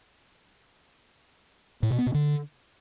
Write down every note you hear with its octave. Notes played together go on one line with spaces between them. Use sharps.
A2
B2
B3
B2
D3